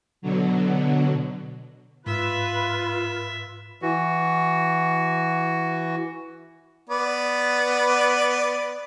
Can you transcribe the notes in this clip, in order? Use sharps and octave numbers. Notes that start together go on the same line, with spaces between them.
B2 D3 F#3
G#2 F4 B4 E5
E3 F#4
B3 D5